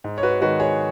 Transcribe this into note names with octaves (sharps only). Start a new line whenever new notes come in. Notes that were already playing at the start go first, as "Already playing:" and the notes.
G#2
C#5
F#4 B4
D#3 G#3 F#4 B4
G#4 C#5